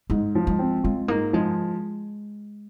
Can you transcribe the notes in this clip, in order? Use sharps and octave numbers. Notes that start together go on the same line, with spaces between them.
G#2 G#3
F3
G#3
C4
G#3 F4
G#2 A#3
F3 G#3